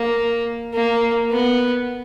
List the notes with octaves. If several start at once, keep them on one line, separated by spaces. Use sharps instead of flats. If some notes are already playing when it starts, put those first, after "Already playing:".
Already playing: A#3
A#3
B3